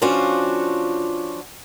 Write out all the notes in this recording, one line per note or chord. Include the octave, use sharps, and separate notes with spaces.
F3 C#4 D4 F4 F#4